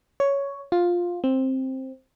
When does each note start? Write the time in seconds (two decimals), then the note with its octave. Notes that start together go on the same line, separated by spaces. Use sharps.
0.20 C#5
0.72 F4
1.24 C4